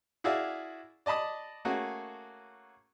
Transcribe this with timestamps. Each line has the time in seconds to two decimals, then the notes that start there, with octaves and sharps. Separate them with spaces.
0.24 E4 F#4 G#4 D5 E5 F5
1.06 D5 D#5 A5 B5 D#6
1.65 A3 A#3 C#4 F#4 G#4